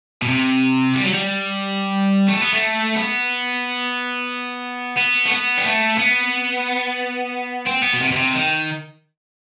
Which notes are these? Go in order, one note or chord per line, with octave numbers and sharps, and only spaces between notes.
B2
C3
G3
F#3
G3
A3
B3
A3
B3
B3
A3
B3
G3
A3
B3
C4
B3
B2
C3
B2
C3
D#3